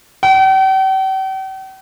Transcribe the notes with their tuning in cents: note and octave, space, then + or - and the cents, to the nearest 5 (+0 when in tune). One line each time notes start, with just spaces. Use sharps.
G5 -45